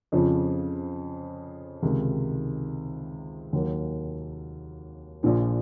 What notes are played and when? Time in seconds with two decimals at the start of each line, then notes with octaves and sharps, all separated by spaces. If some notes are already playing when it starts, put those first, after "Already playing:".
0.12 F2 C#3 F3
1.82 C#2 C3 D#3
3.53 D#2 D#3 F#3 A#3 D#4
5.23 A#1 A#2 F3